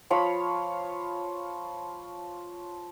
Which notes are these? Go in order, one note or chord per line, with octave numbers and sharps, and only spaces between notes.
F3 C#5 F5 B5